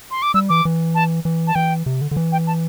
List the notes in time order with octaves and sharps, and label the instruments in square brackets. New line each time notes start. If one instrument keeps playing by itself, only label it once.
[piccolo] C6
D6
[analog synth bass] G3 [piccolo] E6
[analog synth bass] E3 [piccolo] D6
[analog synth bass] E3
[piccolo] A5
[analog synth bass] E3
[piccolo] A5
[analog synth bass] E3 [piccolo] G5
[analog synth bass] C3
D3
D3
E3
[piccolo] G5
A5